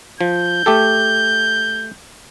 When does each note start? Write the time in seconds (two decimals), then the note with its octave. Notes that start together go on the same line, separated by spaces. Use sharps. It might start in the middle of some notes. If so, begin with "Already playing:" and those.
0.21 F3 G6
0.66 A3 G4 A4